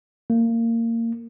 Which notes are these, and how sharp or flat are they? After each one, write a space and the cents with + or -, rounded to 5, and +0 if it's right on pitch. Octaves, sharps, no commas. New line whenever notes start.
A#3 -25